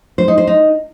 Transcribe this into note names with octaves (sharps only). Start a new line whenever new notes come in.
C5
D#4
C5
D#4